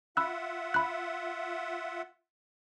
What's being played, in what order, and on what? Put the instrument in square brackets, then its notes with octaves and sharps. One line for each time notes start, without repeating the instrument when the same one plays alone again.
[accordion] F4 E5 F#5 [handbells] B5 E6 F#6
[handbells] B5 F#6